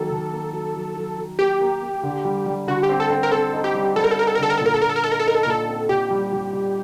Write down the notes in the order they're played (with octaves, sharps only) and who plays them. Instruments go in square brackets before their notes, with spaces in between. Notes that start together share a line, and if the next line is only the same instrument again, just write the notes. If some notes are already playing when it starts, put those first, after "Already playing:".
Already playing: [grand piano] D#3 F#3 A#3 [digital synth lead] A4
[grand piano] D#3
A#3
F#3
F#3
F#3
F#3
[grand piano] A#3 [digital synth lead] G4
[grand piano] A#3
A#3
D3
G3
G3
[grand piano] D3 [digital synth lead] F#4
[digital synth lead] G4
[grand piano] C4
[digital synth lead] A4
[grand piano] C4
[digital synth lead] A#4
[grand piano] C4 [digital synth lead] A4
[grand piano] D#4
[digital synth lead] G4
[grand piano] G3
[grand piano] G3 [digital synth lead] A4
[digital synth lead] A#4
A4
[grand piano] D#4 [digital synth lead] A#4
[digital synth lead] A4
A#4
[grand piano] D3 [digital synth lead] A4
[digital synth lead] A#4
A4
[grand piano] A#2
[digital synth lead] A#4
A4
[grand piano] A#2 [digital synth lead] A#4
[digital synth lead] A4
A#4
[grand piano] D#4 [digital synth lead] A4
[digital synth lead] A#4
A4
[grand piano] D#4 [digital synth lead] A#4
[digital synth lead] A4
A#4
[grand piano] A#2 [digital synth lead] A4
[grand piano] C4
[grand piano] A#2 [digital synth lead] G4
[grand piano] G3
G3
G3